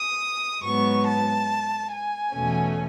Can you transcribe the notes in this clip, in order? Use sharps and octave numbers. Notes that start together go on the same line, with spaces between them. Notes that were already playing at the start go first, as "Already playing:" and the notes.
Already playing: D#6
G#2 F#3 B3 C#6
A5
G#5
E2 B2 A3 C#4